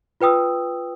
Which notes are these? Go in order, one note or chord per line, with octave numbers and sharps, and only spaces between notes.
F4 B4 G5 D#6 E6